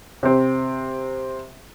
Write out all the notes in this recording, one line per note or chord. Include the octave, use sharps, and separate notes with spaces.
C3 C4